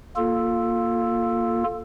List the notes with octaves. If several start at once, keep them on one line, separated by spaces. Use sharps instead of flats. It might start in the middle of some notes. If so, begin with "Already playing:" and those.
A#3 F4 A4